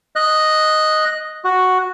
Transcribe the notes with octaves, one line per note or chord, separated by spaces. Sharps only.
D#5 F#6
F#4